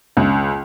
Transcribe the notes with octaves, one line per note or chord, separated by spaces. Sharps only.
C#2